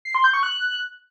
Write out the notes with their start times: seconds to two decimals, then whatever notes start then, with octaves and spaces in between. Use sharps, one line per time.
0.05 C7
0.15 C6
0.24 G6
0.33 C#6
0.43 F#6